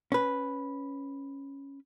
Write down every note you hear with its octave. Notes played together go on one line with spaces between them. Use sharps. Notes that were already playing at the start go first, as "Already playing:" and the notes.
C#4 B4